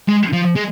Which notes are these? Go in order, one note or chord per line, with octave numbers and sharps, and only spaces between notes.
G#3
F3
G#3